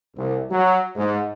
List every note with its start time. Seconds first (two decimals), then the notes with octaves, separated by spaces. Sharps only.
0.17 C2
0.50 F#3
0.95 G#2